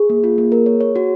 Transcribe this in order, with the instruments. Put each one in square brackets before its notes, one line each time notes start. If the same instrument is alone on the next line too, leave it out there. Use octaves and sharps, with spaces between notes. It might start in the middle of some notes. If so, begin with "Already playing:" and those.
Already playing: [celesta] G#4
[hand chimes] A#3
F4
A#3
A#4
C#5
C#5
F#4